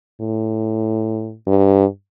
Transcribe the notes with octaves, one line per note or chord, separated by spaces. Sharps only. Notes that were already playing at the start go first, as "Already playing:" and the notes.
A2
G2